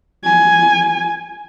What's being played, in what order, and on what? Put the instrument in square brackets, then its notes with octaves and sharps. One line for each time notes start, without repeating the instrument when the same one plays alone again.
[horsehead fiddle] G#5